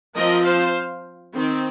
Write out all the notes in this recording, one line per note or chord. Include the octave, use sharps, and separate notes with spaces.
F3 C4 A#4 D#5
C5 F5
D#3 C4